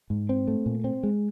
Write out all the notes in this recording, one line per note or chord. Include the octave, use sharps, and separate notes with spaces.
G#2
C4
A3
A#2
C4
G#3